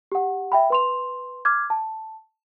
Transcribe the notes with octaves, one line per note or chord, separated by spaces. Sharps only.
G4 F#5
E5 G5 B5
B4 C6 F7
D6 F6 G#6
A5